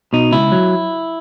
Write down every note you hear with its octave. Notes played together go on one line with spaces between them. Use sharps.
B2 D#4
C#2 E4
F#3